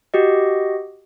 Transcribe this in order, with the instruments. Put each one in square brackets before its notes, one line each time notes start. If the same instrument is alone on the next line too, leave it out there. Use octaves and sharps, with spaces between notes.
[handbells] F#4 G4 D#5